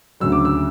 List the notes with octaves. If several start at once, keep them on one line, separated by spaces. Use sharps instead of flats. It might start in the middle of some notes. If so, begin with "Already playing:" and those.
D2 C#3 F#3 E6
D6
E6